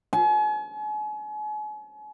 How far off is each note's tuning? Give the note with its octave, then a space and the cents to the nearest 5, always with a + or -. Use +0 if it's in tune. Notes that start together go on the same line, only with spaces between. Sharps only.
G#5 +40